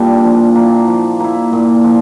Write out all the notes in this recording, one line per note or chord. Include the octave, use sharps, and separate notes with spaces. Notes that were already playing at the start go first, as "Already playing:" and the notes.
Already playing: A#2 G3 D4
F3
A#3 E4
F3
A#3 E4
A#2
F3